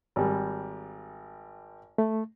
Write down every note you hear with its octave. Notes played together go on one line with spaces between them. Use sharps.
G#1 G3
A3